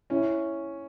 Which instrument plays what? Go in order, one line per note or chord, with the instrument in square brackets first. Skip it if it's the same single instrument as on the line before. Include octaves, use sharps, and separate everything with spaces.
[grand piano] C#4 [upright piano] E4